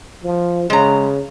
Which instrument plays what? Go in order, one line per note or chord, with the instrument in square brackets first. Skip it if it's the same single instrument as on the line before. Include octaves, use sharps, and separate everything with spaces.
[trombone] F3
[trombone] C#3 [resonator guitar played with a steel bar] G#3 A#5